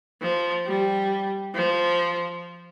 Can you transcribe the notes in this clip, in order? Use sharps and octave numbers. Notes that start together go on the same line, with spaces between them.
F3
G3
F3